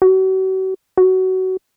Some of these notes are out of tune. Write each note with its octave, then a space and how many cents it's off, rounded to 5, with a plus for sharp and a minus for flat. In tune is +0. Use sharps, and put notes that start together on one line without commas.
F#4 +40
F#4 +20